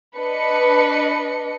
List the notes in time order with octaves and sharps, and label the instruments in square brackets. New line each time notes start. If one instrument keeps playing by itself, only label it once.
[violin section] D4 B4 D#5 C#7